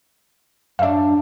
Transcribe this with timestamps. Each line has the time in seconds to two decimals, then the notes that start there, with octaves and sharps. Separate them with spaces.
0.79 F#2 D4 E5 F5